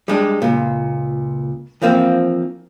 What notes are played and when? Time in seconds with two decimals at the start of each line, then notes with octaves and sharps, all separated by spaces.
0.08 G3 G#3 D4
0.42 C#2 A#2
1.82 E3 F3 A#3 C4